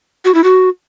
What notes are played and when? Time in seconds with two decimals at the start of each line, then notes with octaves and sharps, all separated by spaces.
0.25 F#4
0.34 E4
0.44 F#4